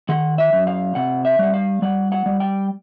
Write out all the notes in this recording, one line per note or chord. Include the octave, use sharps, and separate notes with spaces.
D#3 F#5
E5
F#2
F5
C3 F#5
E5
G3 F#5
F5
G3 F#5
F#5
G3
G5